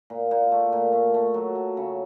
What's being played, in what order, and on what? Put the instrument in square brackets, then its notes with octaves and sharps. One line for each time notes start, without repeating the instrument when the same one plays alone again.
[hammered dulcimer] A#2
A#2
A3
A#2
A3
A3
F#3
F#3
C#3